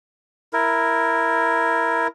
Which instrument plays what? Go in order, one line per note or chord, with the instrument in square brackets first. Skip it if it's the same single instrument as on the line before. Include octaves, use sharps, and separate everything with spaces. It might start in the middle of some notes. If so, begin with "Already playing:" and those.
[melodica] E4 A#4